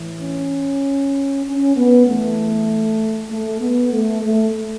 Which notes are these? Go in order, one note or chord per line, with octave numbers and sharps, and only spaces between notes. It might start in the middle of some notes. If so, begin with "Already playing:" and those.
Already playing: A2 E3
C#4
C#4
B3
E2 E3 A3
A3
B3
A3
A3